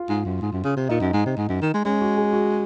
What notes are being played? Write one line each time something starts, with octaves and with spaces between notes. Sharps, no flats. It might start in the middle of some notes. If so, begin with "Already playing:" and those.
Already playing: F4
G#2
F#2
G#2
F#2
C#3
C3
A#2 D#4
F#2
G#2
C3
G#2
F#2
D#3
G#3
G#3 C#4
F#4
G#4
F#4